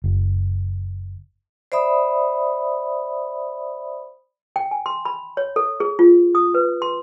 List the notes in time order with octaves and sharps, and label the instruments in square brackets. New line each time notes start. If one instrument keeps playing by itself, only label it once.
[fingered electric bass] F#1
[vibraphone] C5 D5 E5 B5 D#6
[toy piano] G5
G#5
C6
B5
C#5
A4
G#4
F4
D#6
B4
C6